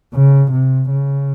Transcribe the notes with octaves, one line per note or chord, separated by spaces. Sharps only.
C#3
C3
C#3